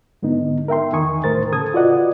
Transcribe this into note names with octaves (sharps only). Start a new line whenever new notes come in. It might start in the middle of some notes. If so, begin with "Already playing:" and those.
G#2 D3 B3 D#4
A#4 E5 G5 C6
E2 D#3 G#5 C#6 D#6
C2 A2 A#4 C5 A6
C#3 A4 D#6 G#6
F4 F#4 B4 D5 D#5 F#5